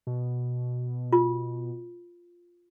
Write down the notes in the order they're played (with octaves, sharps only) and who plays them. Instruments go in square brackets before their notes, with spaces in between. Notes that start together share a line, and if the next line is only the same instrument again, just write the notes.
[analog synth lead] B2
[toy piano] F4